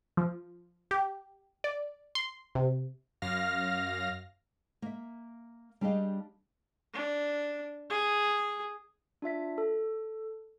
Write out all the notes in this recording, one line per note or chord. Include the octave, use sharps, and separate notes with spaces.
F3
G4
D5
C6
C3
F#2 F5 F6 A#6
A#3 E5
G3 D4 G4 G#4 D#5 F5
D4
G#4
D4 F4 E5 B6
A4